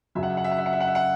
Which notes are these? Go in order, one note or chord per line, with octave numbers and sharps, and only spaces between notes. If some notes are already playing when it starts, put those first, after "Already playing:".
F#2 C#3 F#3 E5
F#5
E5
F#5
E5
F#5
E5
F#5
E5
F#5
E5
F#5